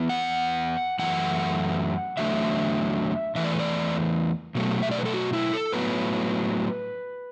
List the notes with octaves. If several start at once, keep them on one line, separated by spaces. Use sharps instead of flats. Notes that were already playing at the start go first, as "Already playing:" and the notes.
Already playing: E2 E3 B3
F#5
F#2 E3 A3 F#5
E2 D3 F#3 A3 E5
E2 E3 A3 E5
D5
B4
D5
B2 F#3 A3
E5
D5
B4
A4
F#4
E4
A4
A2 F#3 B3 B4